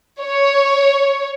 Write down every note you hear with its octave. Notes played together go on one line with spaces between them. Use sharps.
C#5